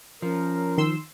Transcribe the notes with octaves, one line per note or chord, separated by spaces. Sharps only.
F3 C#4 A#4
D#3 C6 E6